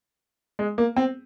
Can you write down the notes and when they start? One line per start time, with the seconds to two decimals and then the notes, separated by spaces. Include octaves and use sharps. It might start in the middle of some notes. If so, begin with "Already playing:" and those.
0.59 G#3
0.78 A#3
0.96 C4